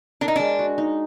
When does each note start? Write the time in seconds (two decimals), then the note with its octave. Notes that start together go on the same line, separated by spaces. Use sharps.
0.21 D4 A#4
0.28 D#4
0.36 G#3 D4
0.59 F#4
0.78 D#4